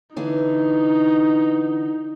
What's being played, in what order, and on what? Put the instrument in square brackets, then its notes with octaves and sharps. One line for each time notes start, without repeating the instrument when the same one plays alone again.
[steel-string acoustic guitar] D3 E3 B3 [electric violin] D#4